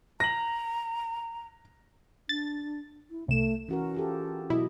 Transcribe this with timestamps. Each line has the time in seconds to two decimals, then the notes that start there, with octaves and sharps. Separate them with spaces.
0.20 A#5 A#6 F#7
2.29 D4 A6
3.11 E4
3.28 C2 A3 E7
3.69 E3 C#4 F#4 A#4
3.94 F4 G4 A4
4.50 B2 F#3 E4 D#5